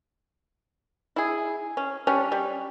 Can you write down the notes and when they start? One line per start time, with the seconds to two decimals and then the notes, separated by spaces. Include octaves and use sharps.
1.16 E4 G#4
1.77 C#4
2.07 G3 C#4 D4
2.32 G3